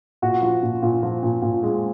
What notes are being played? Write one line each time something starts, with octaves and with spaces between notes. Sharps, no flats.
A#2 F#4
F3
A#2
A#2
F3
A#2
A#2
G#3